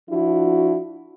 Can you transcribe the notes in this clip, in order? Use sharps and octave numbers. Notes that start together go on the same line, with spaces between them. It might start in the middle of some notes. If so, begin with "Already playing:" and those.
F3 D4 E4 F#4